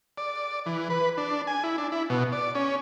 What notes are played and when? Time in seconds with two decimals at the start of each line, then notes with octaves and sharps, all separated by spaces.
0.18 D5
0.66 E3
0.90 B4
1.17 D4
1.47 G#5
1.64 E4
1.78 D4
1.92 E4
2.10 B2
2.32 D5
2.55 C#4